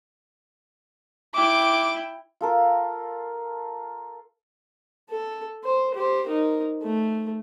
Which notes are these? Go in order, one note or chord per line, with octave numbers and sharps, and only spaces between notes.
E4 G5 D6
F4 A4 A#4
A4
C5
G4 C5
D#4 A#4
A3